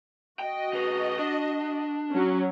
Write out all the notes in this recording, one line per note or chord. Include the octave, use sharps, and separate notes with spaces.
F#4 D#5 G5
C#3 B4
D4
F#3 C#4